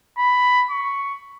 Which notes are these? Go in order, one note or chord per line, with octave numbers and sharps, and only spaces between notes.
B5
C#6